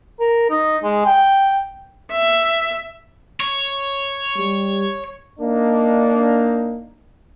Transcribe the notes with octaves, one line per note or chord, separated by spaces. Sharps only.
A#4
D#4
G#3
G5
E5
C#5
G3
A#3 D4 D#4